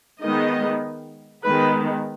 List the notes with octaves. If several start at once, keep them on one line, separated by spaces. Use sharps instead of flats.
D#3 G#3 B3 D#5
D#3 G#3 B3 B4